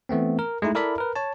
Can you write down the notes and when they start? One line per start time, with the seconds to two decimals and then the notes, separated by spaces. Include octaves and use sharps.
0.09 E3 A3 B3 C4
0.39 A#4
0.62 G#3 A3 D#4 E4
0.75 E4 A4 A#4 D5 E5 B5
0.98 A#4 B4
1.16 C#5 A5